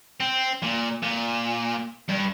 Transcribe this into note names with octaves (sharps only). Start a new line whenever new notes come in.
C4
A#2
A#2
G2